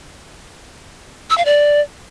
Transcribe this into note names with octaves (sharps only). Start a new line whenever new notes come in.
E6
F5
D5